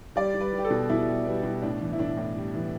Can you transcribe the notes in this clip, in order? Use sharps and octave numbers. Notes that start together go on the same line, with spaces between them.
G3 D5
G3
B4
G3
G4
A4
B2
B2 E4
G3
G3 B3
B2
A2 D4
E3
E4
A2 D4
A2
G3
E3